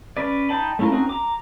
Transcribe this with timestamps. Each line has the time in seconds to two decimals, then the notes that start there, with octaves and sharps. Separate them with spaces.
0.17 C#4 B4 D5
0.49 D#4 G5 A5 B5
0.79 A3 C#4 E4 F4 A#4
0.91 C4 C#4 D#4 F#4 A#4
1.09 A#5 D6